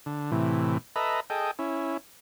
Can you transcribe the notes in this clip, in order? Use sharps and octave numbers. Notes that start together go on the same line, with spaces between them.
D3
A2 C3 E3
A4 B4 D#5 E5 A#5 B5
G#4 A4 D#5 G5
C#4 E4